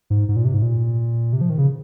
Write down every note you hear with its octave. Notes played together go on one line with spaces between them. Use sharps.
G#2
G#2
A#2
C3
G#2
A#2
C3
F3
D#3
C#3